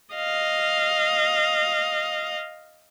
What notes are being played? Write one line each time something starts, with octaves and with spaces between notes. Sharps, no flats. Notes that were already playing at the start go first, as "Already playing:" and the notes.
D#5 F5